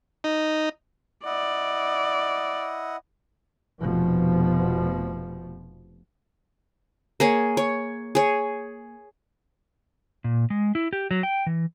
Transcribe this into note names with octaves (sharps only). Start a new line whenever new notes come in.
D#4
E4 D5 D#5 F#5
F1 B2 F3
A#3 G#4 C#5
C#5
G#4 C#5
A#2
G#3
E4
G4
F#3
G5
E3